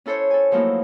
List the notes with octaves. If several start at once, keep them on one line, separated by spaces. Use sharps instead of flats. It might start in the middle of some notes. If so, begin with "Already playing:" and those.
C#4 E4 A4 C5 C#5
A4 G#5
F3 F#3 A3 A#3 D#4 E4